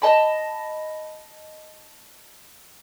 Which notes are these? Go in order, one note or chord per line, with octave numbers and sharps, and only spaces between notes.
D#5 A5 B5